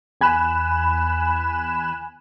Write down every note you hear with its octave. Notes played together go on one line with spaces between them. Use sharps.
E2 G#5 B5 F#6 E7